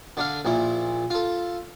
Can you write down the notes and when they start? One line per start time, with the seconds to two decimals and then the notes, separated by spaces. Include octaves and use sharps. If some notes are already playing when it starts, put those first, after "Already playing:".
0.17 D3 D4 F5
0.45 A#1 A#2 E4
1.10 F4 A4